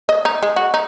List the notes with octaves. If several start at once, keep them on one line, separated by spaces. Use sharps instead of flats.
D#5
D#4
G#3
F#4
D#4